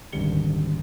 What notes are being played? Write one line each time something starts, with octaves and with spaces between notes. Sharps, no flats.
D#1 G#1 D2 G3 C#7 G7